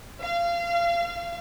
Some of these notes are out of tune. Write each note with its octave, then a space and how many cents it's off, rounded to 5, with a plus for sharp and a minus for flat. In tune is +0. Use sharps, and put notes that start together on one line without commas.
F5 -25